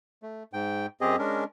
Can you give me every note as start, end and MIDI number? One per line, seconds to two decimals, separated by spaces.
0.23 0.43 57
0.53 0.86 44
0.53 0.86 79
1.01 1.16 42
1.01 1.16 60
1.01 1.16 67
1.01 1.16 68
1.01 1.16 75
1.19 1.44 56
1.19 1.44 61
1.19 1.44 62
1.19 1.44 70